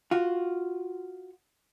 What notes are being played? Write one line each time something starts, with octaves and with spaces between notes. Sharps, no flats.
F4 F#4